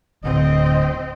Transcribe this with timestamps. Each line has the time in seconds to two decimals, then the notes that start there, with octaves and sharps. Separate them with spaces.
0.24 D1 D2 C4 D#5